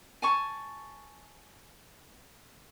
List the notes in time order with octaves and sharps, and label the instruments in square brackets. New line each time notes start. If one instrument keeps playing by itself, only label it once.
[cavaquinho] G#5 A5 C#6